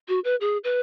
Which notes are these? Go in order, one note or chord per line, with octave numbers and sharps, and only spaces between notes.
F#4
B4
G#4
B4